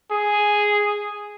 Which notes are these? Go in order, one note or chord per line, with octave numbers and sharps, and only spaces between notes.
G#4